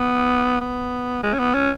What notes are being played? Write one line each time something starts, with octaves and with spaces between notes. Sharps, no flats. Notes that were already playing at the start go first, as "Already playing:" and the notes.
Already playing: B3
B3
G#3
C#4
B3
C#4